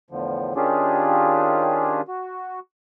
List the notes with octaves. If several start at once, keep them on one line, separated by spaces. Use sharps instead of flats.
E2 A2 D3 F3
D#3 C#4 D4 F4 G4 G#4
F#4